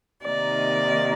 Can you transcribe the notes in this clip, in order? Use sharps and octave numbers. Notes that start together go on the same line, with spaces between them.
C3 D#3 A#3 D#4 D5